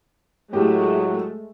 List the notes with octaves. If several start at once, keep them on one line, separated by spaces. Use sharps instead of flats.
A2 F#3 G#3 A3 G4